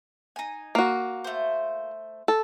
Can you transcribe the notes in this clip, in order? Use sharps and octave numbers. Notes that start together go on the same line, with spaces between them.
D#4 G#5
A#3 F#4
A3 C5
A4